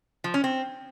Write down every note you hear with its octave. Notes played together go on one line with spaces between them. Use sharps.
F3
C#4
C4